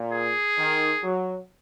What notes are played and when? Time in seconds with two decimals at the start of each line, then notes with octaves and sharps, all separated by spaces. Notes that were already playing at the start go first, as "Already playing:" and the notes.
Already playing: A#2
0.13 G#4
0.58 D#3
1.03 F#3